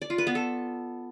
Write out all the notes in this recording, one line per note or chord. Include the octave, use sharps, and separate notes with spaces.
D5
F4
B4
B3
A4